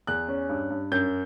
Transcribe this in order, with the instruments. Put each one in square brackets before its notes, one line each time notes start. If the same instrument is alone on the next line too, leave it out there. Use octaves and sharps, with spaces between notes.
[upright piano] E2 F#6
C#4
G2
G2
F#2 G6